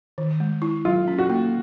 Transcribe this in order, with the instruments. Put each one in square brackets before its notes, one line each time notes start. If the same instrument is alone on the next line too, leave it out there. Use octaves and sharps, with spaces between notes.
[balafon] D#3
G#3
E4
[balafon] F#3 [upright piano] F4
[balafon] C#4
[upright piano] F#4
[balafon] A#3